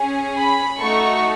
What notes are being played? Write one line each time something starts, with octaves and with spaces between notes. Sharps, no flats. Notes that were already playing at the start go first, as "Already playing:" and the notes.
Already playing: C#4 G#4
B5
A3 D#4 F#4 A4 C#6